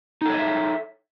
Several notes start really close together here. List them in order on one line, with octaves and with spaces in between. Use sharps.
D#4 A4 C#5 D#5 E5